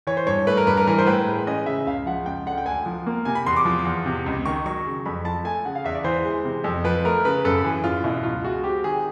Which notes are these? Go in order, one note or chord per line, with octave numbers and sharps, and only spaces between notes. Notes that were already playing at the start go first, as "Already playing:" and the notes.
E3 C#5
C5
G2 C#5
A3 B4
A#4
G2 B4
A#4
E3 A#4
C5
A2 B4
G#3
C#4 D#5
C#3 E5
C#2 F5
F3 F#5
C#2 G5
D3 F#5
G5
D2 G#5
F3
A#3
C3 G#5
B5
E2 C6
D6
F3
E2
C3
C#2
D#3 C#6
F#3 C#6
C#3
F2 B5
F3 A5
A3 G#5
C#3 F#5
F5
E2 E5
D5
E3 C5
G#3
C3
F2
F3 B4
A3 A#4
C#3 B4
F#2 A4
E3 G#4
F#2 F4
B2 E4
C#2 F4
G#3 F#4
C4 G4
D#3 G#4